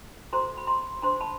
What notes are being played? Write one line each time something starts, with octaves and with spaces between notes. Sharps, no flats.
F#4 A4 C5 A#5 C6
B5
A#5 C6
D4 G4 C5 A#5 C6
A5 B5